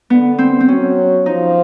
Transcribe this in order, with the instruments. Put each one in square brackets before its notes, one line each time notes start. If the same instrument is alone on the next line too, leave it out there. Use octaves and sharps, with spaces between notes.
[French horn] D3 [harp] B3
[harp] C4
C4
[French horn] F#3 [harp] C#4
[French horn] F3 [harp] D#4